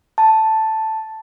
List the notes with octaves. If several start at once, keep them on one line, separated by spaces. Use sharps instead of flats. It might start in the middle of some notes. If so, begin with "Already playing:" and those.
A5